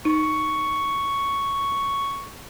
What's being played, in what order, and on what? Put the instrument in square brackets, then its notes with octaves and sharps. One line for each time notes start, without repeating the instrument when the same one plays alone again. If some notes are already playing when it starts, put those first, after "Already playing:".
[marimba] D#4 [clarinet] C#6